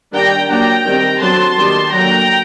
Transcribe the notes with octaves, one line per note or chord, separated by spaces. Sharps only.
D#3 G3 D4 G5 A#5
F#3 A#3 D4 G5 A#5
D#3 G3 C4
D3 F#3 C4 A5 C6
D#3 G3 A#3 D4
D3 F#3 A#3 G5 A#5